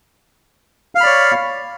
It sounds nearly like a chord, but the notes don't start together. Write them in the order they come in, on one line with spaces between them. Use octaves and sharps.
F5 F6 B5 D5 C#5